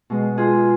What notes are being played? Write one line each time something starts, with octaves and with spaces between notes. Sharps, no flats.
B2 G#3
F4 G#4